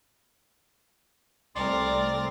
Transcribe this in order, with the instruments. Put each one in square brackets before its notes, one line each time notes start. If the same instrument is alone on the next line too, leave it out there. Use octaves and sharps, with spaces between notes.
[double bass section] C2 A3 [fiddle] C4 A#4 [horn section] D5 [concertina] C6